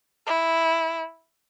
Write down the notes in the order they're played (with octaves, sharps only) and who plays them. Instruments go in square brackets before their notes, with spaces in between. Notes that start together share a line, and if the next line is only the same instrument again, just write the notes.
[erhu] E4